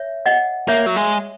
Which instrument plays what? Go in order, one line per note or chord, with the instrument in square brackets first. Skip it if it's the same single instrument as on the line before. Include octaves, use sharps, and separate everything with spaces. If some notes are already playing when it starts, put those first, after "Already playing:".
Already playing: [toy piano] C#5 E5
D#5 F#5
[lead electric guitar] A#3 [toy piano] C#5 E5
[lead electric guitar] F#3
G#3